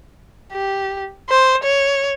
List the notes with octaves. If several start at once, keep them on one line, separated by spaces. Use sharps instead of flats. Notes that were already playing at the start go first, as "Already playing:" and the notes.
G4
C5
C#5